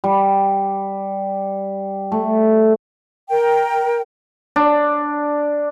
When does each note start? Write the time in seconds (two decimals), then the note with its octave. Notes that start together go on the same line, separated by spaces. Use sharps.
0.04 G3
2.12 A3
3.30 A#4 G5
4.56 D4